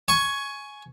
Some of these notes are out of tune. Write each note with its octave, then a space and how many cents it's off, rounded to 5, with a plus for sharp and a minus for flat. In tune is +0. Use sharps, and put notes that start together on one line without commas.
G#5 +15 C#6 +0